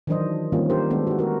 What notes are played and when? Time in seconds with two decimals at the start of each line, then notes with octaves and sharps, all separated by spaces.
0.07 D#3 E3 F#3 D4 C5 D#5
0.52 D#3 G3 A#3 C4 C#4 F4
0.70 D4 G4 A#4 C5
0.90 D#3 G#3 B3 C4 D4 A4
1.07 F#4 G4
1.19 F#4 A#4